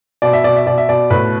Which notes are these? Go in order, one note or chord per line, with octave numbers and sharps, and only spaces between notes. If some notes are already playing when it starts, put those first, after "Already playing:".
B2 D5
E5
B2 D5
E5
B2 D5
E5
B2 D5
A2 B4